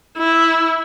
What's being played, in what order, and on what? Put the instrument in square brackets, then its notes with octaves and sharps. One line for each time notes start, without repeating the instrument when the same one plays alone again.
[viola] E4